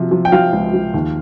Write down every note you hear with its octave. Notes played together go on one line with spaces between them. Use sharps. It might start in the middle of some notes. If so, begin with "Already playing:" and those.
Already playing: C3 F3
F3
G5
F3 F5
C#2
F3
D#2